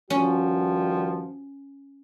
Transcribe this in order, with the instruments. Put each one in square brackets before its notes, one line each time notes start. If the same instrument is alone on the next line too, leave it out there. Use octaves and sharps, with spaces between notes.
[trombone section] G2 D#3 F3 [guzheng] C#4 [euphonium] F#4